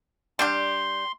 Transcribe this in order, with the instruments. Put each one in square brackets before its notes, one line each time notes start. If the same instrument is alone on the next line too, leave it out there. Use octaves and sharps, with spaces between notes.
[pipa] G3 D4 G4 [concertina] C6